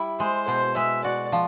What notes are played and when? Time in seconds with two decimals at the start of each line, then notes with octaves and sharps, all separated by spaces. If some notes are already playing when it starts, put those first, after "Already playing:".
Already playing: G3 E4
0.19 G#3 C5
0.48 B2 C5
0.76 G#3 E5
1.04 F#4 D5
1.32 F3